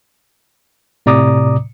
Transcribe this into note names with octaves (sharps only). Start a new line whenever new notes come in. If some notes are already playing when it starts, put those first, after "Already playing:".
A2 C3 D5 A#5 D6 D#6